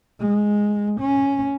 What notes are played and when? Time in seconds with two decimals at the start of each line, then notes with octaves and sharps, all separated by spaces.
0.19 G#3
1.00 C#4